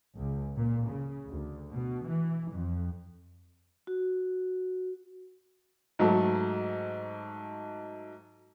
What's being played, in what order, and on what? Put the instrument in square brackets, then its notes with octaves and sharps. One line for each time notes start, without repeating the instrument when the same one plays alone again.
[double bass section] C#2
A#2
C#3
D2
B2
E3
F2
[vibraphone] F#4
[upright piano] G#2 F#3 A3